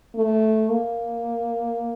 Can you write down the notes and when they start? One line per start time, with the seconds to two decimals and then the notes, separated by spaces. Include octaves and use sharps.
0.15 A3
0.70 A#3